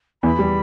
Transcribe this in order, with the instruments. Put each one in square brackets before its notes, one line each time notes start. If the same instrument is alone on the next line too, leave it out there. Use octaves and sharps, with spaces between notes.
[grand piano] E2 E3 [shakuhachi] B5
[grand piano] G3